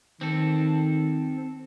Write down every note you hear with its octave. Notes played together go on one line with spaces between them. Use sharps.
D#3 C4 A4